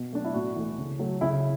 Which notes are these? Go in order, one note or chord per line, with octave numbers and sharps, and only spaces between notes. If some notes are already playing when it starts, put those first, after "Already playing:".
Already playing: B2
F#3 A3 D4
E4
A2 F#4
E3 A3
C#3
F#3 A3
C#3 E4